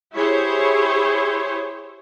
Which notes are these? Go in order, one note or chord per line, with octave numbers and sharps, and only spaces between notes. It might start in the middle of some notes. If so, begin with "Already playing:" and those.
E4 G4 G#4 C5 C#5